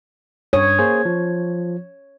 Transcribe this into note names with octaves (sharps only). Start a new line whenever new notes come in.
G2 C#5 D#6
A#3 G#4 C5
F3